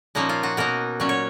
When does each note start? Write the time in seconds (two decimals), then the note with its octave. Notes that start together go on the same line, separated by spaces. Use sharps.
0.15 A#2 F3 A#3 C#4 D#4
0.29 F4
0.43 F#4
0.57 B2 A#3 D#4 A#4
1.00 A#2 F#3 C#4
1.09 C#5